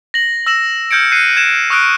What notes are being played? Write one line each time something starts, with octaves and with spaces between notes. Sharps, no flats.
A#6 F#7
E6 A#6 E7 F#7
F6 G6 G#6 C#7 D7
F#6 C7 C#7 D#7
G#6 E7
C#6 D#6 F6 F#6 D7